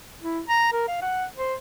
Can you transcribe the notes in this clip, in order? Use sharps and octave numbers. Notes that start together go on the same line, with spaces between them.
E4
A#5
A#4
F5
F#5
C5